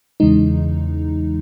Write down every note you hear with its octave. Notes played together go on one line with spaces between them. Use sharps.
E2 C#3 E3 G#3 D#4